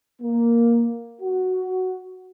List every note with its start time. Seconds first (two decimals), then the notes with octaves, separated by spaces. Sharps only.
0.22 A#3
1.22 F#4